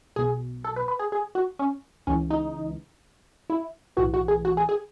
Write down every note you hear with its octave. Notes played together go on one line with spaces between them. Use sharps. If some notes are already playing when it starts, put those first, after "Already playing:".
B1 B2 G#4
A4
B4
B4
G#4
G#4
F#4
C#4
C#2 C#3 E3 C#4
D#4
E4
B1 A2 E3 F#4
F#4
G#4
F#4
G#4
G#4